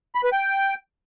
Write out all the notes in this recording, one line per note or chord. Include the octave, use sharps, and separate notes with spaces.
B5
B4
G5